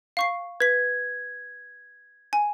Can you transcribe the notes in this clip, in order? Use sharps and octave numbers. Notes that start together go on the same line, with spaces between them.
F5 C#6 C7
B4 G#6 B6
G#5